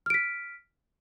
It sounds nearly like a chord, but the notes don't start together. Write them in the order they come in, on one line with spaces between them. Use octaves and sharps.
F6 D7 B6